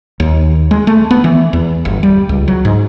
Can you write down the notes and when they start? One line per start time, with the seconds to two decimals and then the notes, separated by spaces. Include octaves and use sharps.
0.20 D#2
0.71 G#3
0.87 A3
1.11 B3
1.24 E3
1.53 E2
1.85 G1
2.03 G3
2.29 C#2
2.48 F#3
2.65 G#2